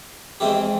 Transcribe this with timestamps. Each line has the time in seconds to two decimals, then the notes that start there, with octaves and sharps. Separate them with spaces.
0.40 F2 E3 G#3 C4 E4 G4